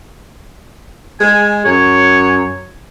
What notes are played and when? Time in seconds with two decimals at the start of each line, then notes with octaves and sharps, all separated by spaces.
1.20 G#3 G#5
1.65 F#2 C#5